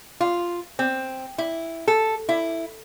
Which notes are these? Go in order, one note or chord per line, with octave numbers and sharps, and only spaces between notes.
F4
C4
E4
A4
E4